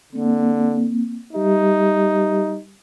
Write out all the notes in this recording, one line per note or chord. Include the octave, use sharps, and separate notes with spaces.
D3 A#3 C4
G3 D#4 G4 E5